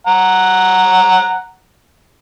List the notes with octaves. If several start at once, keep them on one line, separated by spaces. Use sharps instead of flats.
F#5 A#5